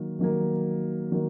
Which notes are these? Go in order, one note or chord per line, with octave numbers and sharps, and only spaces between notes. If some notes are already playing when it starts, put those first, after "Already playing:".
Already playing: D#3 F#3 A#3
D#3 F#3 A#3
D#3 F#3 A#3